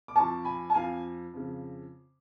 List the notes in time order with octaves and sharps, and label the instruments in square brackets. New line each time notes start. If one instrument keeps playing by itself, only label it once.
[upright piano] D6
F2 F3 A5 C#6
G#5 B5
A5
F2 F3 F5 G#5
F2 C#3 F3